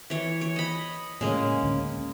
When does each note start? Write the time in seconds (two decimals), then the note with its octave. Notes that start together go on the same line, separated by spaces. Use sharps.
0.10 E3 C#5
0.41 C#5
0.56 D#5 B5
1.21 A2 C#3 G#3 A#3 C#4
1.63 D2